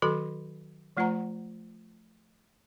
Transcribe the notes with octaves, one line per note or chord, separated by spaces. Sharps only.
D#3 F#3 F#4 A4 B5
F3 A3 F4 C5 F#5 A#5